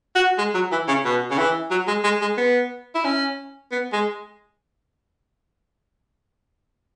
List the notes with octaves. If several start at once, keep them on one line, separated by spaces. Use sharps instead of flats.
F#4
G#3
F#3
E3
C#3
B2
C#3
E3
F#3
G#3
G#3
G#3
B3
E4
C#4
B3
G#3